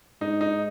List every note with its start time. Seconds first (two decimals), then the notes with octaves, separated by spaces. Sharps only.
0.21 G#2 D#4
0.41 D#4